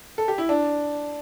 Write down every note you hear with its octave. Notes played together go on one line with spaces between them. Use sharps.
A4
G4
E4
D4